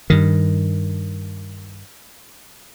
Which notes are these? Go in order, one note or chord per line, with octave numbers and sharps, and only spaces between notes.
G2 D#3